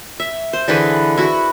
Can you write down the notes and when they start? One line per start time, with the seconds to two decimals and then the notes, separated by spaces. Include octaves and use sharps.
0.20 E5
0.53 C5
0.68 D3 E3 G#4 B4
1.17 E4 F#4